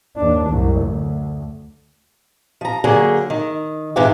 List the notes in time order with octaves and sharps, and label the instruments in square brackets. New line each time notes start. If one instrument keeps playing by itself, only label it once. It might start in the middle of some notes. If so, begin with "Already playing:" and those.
[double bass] D#2 D4
C2 F#2
D2
[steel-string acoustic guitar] F3 A#5
D3 F#3 A#3 G#4
D#3
G#2 C3 E3 F4 G4